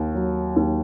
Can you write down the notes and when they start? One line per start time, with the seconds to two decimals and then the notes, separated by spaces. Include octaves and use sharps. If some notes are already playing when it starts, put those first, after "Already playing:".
Already playing: D#2
0.15 F#3
0.56 D#2